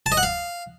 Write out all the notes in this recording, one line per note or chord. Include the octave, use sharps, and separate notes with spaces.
A5
D#5
F#5
F5